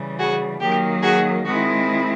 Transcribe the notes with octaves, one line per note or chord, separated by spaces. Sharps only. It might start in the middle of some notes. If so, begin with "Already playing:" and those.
Already playing: C#3 E3 G3
F#4 G#4
D#3 F#3 A#3 G4
F#4 G#4
D#3 G#3 C4 E4 F#4